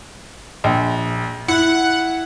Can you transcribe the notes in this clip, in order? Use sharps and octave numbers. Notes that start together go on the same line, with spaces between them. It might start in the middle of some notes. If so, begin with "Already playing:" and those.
A#1
E4 F#5